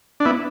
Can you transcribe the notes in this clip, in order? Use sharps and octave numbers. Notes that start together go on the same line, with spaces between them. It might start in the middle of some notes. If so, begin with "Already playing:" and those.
D4
B3 E4